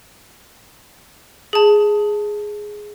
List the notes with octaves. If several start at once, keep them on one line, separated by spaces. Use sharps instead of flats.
G#4 A5